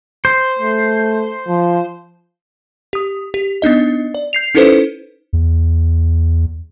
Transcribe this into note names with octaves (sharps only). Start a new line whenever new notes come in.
C5
A3
F3
G4 D#6
G4
B3 D4 D#4 D#5
D5
G6 C7 F7
C#4 D#4 E4 A4 B4 C5
E2